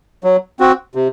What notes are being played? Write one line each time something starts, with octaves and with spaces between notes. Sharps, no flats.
F#3
C4 F#4
C3